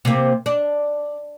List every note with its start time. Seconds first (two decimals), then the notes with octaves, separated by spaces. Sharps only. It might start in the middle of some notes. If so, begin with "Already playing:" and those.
0.05 C3 A#3
0.46 D4